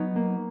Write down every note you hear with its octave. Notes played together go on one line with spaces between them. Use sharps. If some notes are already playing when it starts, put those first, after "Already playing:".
Already playing: F#3 B3 D#4
A#3